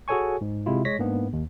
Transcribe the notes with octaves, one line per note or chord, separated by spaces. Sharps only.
F#4 G#4 A4 C#5 G#5 C#6
G#2
C3 G#3 E4 F4
G#3 C#5 A#6 B6
G#2 A#3 B3 D4
D#2